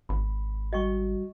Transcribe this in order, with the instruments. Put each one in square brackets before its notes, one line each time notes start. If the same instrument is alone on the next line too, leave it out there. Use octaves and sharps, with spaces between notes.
[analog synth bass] G#1 [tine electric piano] B5
[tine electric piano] G3 F#4 [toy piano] D#5 G5 C#6